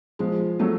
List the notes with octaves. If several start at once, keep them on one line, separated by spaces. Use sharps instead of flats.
F3 G#3
F#3 A3